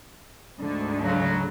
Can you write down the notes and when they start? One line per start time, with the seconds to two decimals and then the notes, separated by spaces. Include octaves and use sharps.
0.61 D2 G#2 D3
1.02 C#3 F#3